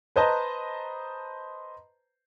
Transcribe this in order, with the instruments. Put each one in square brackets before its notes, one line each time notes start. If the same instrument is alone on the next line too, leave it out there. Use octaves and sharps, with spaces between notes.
[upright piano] B4 C5 D#5 A5 A#5